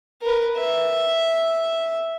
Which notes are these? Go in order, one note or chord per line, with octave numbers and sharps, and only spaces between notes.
A#4 B4
E5